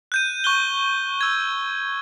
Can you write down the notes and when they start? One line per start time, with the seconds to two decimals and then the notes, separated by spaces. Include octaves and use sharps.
0.12 F#6 G6 D#7
0.44 C#6 F#6 G7
1.21 E6 G#6